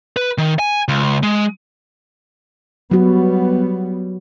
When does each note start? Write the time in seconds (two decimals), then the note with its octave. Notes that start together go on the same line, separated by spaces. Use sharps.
0.16 B4
0.38 D#3
0.59 G#5
0.88 C#2
1.23 G#3
2.91 F#3 G3 B3 F#4